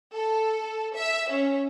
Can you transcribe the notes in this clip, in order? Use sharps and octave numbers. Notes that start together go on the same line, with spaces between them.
A4
E5
C#4